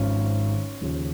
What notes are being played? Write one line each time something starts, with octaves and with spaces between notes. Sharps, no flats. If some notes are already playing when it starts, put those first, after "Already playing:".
Already playing: G#1 G#2 F3 C#4 F4
D#2 C#3 F3